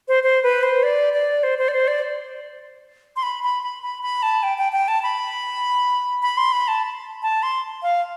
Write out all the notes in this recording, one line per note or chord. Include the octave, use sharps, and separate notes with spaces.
C5
C5
B4
C5
D5
D5
C5
C5
D5
C5
D5
C6
B5
B5
B5
B5
B5
A5
G5
G5
G5
A5
B5
B5
C6
B5
A5
A5
C6
F5